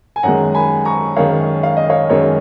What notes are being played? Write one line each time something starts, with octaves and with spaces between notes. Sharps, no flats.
G#5
F#2 D#3 G#3 F#5 A#5
G#5 B5
A#5 C#6
F#2 D#3 G#3 C#5 F5
F5
D#5
C#5 F5
F#2 D#3 G#3 C#5